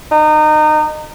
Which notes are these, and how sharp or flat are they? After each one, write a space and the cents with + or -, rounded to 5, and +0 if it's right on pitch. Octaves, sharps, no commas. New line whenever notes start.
D#4 -25